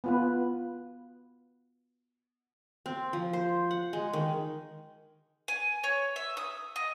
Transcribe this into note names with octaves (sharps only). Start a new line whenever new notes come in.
B3 F4 B4
C4
F3
C5
F#5
G#3
D#3
G#5
C#5
E5
D#6
D#5